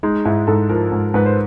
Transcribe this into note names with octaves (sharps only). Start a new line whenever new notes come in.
G#3 D#4
G#2 E4
G#2 A4
F3 A#4
G#2
G#2 B4
C5